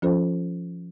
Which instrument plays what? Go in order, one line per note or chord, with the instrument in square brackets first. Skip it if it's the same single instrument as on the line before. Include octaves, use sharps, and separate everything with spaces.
[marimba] F3 C#4 F4 A4 C5